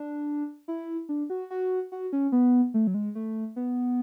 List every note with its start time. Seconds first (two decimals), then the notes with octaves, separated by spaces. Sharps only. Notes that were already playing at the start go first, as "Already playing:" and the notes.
Already playing: D4
0.68 E4
1.09 D4
1.30 F#4
1.51 F#4
1.92 F#4
2.13 C#4
2.32 B3
2.74 A3
2.87 F#3
2.94 G#3
3.15 A3
3.56 B3